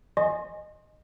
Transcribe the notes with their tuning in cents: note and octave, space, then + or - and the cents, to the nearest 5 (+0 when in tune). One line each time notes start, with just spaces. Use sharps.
D#5 -15 G#5 +0 C6 +25